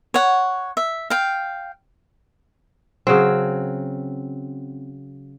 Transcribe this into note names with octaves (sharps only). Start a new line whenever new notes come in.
C#5 F#5
E5
F5 G5
C#3 F#3 C4